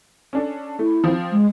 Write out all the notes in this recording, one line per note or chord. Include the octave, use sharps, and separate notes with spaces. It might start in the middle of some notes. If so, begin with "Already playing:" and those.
C#4 D4 A4
A3 E4
F3 C4
G#3